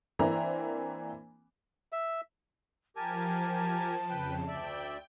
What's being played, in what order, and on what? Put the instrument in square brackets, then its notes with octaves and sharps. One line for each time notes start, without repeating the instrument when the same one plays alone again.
[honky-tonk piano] E3 A#3 C4 D4 E4 A#5
[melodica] E5
[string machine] F3 [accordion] G4 A#4 G#5 [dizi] A5
[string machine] F2 C#3 [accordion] B4 G5
[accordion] D2 D5 E5 [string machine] G5